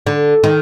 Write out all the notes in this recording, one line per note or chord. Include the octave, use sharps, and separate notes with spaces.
D3
D#3